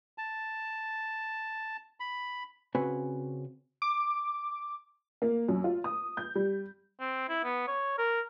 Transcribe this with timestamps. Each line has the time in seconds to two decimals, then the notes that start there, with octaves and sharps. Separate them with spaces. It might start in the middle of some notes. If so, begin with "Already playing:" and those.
0.18 A5
2.00 B5
2.75 C#3 C4 F#4 B4 G#5
3.82 D6
5.22 A#3
5.49 F#2
5.64 F4
5.84 D#6
6.17 G6
6.35 G3
7.00 C4
7.29 E4
7.44 B3
7.68 C#5
7.98 A#4